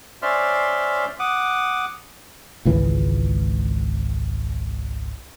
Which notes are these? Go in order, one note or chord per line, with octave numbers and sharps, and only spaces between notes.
C#4 C5 D5 E5 C6 F6
F#5 D6 D#6
G#1 C#2 E3